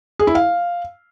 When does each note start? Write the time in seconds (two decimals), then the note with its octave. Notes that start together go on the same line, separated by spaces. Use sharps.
0.19 G#4
0.27 E4
0.35 F5